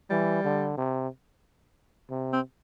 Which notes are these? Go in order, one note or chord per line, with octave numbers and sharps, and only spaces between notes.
E3 G3
D3
C3
C3
C4